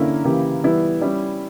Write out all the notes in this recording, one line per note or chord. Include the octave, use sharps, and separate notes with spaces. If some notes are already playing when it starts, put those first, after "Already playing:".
Already playing: D3 A#3 C#4 E4
C#3 E3 A#3 E4 G4
E3 G3 B3 E4
G3 C#4 E4